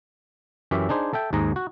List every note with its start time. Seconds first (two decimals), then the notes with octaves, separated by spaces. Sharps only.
0.71 F#2 E3 C#4 G4 E5
0.89 D4 D#4 G#4 C5
1.13 A4 E5 G5
1.33 D#2 G#2 G#4 A#5
1.56 F#4